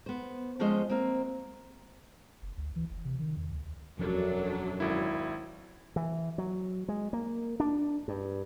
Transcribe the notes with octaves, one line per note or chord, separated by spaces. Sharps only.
B3 C5
F3 G#3 B3 C#4 C5 D#5
A#3 C4
F#1
D2
E3
F#1
C3
D#3
E2
D2
E1 F#2 F3 F#3 D4 A4
G#1 E4
E3
F#3
G#3
A#3
D4
G2